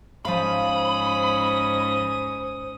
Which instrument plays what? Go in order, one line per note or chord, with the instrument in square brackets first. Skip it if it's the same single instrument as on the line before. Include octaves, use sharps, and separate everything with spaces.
[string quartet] G#2 C#4 D#6 [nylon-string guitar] F3 F5 [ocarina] C5 [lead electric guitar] B5